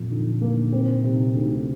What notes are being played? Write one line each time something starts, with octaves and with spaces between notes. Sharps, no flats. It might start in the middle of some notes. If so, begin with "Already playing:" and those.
Already playing: F2 A#2
D3
A#3
C4
C3
D2